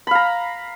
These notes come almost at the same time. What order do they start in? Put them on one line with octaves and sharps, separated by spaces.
B5 F5 A#5